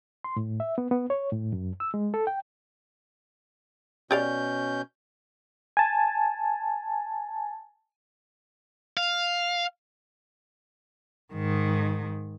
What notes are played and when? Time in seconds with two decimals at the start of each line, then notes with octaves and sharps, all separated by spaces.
0.24 C6
0.36 A2
0.60 E5
0.78 B3
0.91 B3
1.10 C#5
1.32 A2
1.53 F#2
1.80 E6
1.94 G#3
2.14 A4
2.27 G5
4.11 B2 C#4 G4 D5 F5 G6
5.77 G#5 A5
8.97 F5
11.33 G#2 D#3